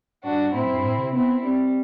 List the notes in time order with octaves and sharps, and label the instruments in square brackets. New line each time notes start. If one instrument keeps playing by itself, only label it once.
[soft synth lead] G2 [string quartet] D4 F#4
[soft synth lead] A2 [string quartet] C4 E4
[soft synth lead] F#2
G2
A2
C3
[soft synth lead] B3 [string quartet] C4 E4
[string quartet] G3 [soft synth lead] C4